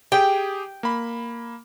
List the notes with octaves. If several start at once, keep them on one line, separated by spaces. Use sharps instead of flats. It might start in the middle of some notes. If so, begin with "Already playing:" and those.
G4 G#4 G5
A#3 B5